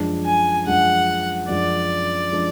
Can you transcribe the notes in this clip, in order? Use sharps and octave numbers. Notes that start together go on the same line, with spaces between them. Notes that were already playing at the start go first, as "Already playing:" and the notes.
Already playing: F#2 F3 G#3 D4
G#5
F#2 F3 G#3 D4 F#5
F#2 F3 G#3 D4 D5
F3 G#3 D4